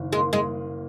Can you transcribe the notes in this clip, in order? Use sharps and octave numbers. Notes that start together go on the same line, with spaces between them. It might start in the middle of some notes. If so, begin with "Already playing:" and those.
Already playing: F#1 D#3
G#3 A#3
G#3